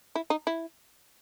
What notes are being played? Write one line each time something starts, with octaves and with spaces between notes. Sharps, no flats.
E4
D#4
E4